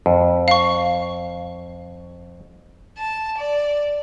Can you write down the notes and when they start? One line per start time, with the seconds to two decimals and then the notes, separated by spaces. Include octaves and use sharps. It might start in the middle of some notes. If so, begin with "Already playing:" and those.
0.06 F2
0.48 F5 C#6
2.98 A5
3.38 D5